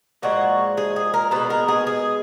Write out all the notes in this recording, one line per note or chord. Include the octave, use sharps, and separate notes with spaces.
A#2 F3 G#3 F#4
G#4
G#4
A#4
B2 G#3 B4
A#4
G#4
G#4